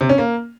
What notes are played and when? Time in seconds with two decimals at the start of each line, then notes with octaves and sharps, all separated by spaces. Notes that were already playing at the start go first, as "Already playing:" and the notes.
0.01 C3
0.09 C#4
0.18 A#3